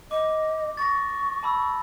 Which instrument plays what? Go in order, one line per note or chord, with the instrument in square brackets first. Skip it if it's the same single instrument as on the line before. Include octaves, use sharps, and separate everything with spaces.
[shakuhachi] D#5 [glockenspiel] D6
[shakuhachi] C#6 [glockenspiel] A6 A#6
[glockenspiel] A5 B5 E6